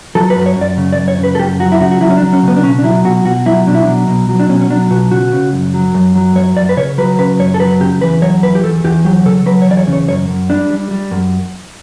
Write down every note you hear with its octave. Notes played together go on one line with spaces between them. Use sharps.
F#3 A4
B4
F#2
C#5
F#2
D5
C#3
D5
F#2
C#5
C#3 B4
A4
F#2 G4
F#3 F#4
E4
C#3 F#4
F#4
F#3 E4
C#4
D4
F#3
C#4
C#3 B3
D4
B2 C#4
D4
F#3 E4
B2 F#4
B2 F#4
F#3 E4
B2 D4
E4
D4
F#3
B2
F#3
D4
B2 C#4
C#4
F#3 D4
B2 F#4
C#3 F#4
C#3
F#2
F#3
F#2
F#3
F#2 C#5
F#2 D5
B4
C#3 C#5
F#3 B4
C#3 B4
F#2 C#5
A4
F#3 B4
C#3 G4
E2 B4
F#3 C#5
E2 B4
G4
E2 A4
E2 G4
F#3 G4
C#3 A4
F#3 B4
C#5
E2 D5
C#5
C#3
C#5
F#2 C#5
F#2
G3 D4
G3
G3
F#2